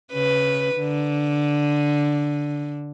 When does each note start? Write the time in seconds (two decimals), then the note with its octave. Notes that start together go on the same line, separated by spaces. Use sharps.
0.13 C#3 B4
0.76 D3